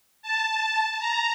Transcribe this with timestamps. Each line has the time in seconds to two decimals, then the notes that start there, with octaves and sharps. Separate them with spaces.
0.22 A5
0.99 A#5